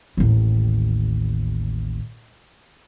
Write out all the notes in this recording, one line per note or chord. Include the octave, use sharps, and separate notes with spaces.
A1 D#2